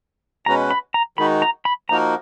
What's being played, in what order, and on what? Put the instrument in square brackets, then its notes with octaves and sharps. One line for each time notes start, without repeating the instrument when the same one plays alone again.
[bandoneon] B2 G#3 C#4 F#4 B4 [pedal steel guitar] A#5
[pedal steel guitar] B5
A#5
[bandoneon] D#3 G#3 D#4 F#4 [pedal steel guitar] B5
[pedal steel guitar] A#5
B5
[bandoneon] F3 A#3 D#4 F#4 A#4 [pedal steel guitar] A#5